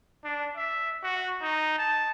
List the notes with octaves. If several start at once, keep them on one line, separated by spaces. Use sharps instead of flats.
D4
E5
F#4
D#4
A5